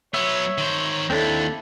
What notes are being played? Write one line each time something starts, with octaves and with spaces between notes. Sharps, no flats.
F#3 B3 C#5 E5
D#3 C5
D#2 C4 D4 E4 A4